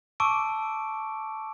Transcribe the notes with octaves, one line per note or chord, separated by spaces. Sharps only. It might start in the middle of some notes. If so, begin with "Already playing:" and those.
A5 C#6 D6 E6 D7